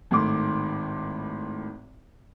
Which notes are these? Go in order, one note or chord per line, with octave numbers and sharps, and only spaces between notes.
G#1 A2 D#3 A3 C6 D6